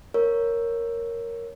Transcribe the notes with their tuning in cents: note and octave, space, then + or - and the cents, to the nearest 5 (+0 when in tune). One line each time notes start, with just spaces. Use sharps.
A#4 +0 C#5 +0